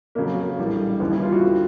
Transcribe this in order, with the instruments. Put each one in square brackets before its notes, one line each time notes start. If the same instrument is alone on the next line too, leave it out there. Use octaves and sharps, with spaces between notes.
[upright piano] F2 C#3 F#3 [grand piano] A#3
[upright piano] A#1 A2 E3 G3
[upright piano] D#2 C#3 E3 G3 [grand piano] B3
[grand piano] E4
F4
F#4
[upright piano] D3